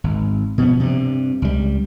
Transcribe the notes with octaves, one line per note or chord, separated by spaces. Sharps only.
G#1
B2 F3 B3
G2 C3
C#2 G3